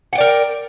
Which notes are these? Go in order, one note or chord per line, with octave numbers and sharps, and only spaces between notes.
A#4 D5 F#5 G5